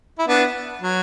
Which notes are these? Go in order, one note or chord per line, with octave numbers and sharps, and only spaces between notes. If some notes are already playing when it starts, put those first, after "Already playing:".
E4
B3 D4
F#3